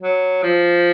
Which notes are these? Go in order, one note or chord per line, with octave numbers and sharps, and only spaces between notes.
F#3
F3